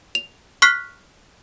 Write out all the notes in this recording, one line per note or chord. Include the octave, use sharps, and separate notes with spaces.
F7
C#6 F6 F#6 B6 C7